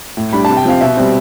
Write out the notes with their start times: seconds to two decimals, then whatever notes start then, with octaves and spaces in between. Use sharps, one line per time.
0.17 A2
0.32 G3 D4 B5
0.45 C3 A5
0.57 G5
0.65 F3 C4 F5
0.81 B2 E5
0.97 G3 C4